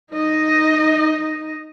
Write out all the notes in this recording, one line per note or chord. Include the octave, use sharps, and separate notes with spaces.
D#4 D#5